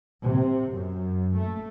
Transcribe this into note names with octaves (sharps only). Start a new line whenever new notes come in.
C3
F#2
A3